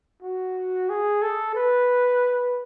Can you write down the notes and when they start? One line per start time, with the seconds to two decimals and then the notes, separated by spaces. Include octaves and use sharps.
0.22 F#4
0.90 G#4
1.22 A4
1.55 B4